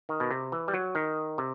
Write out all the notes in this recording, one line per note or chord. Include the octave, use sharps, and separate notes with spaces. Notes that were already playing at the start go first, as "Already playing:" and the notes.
D#3
B2
C3
E3
G3
F#3
D#3
C3